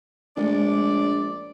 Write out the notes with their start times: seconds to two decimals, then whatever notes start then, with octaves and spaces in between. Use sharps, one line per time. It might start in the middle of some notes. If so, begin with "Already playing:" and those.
0.37 A#1 G#3 A3 C#4 D5